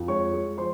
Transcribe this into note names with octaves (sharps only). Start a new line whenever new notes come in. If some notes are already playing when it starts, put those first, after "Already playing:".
Already playing: F2
G#3 C#5 C#6
G#3
F3 C5 C6